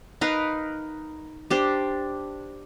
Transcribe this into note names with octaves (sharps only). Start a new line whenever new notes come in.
D#4 A#4 B4 F5
D4 G4 C5